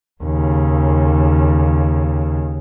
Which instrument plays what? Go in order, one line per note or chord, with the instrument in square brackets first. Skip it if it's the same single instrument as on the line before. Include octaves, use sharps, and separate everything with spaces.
[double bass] D#2 C#3